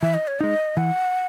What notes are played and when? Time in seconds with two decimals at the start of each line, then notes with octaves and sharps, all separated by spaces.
0.02 E3 E5
0.14 D#5
0.28 C#5
0.40 G#3 D#4 D#5
0.77 E3 F#5